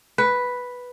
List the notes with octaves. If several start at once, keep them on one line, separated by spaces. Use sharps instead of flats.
B4